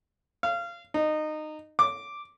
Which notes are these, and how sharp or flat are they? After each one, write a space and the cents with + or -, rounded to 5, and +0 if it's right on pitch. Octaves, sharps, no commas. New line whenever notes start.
F5 -25
D#4 -20
D6 +0